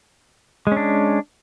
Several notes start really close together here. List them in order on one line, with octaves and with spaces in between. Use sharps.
G#3 C#4 D4